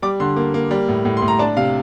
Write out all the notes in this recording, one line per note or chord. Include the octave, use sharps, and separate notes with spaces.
G3 D6
D3 C6
A#3
A#3
G3
A2
A2
C6
A2
A#5
D4 A5
C3 F5